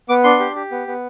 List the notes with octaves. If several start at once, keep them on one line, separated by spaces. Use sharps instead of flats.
B3 D6
D4 C6
G4
G4
B3
B3